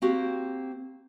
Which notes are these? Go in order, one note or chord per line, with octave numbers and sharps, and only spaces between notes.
A#3 C4 F#4 G4